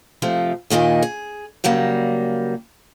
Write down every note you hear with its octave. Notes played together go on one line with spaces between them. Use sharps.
C3 F3 A3
D#2 A#2 D#3 D#5 G#5
G#4
C#3 F#3 G3 A#3